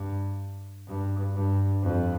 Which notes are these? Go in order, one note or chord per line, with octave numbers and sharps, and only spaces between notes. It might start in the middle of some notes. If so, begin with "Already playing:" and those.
Already playing: G2
G2
G2
F2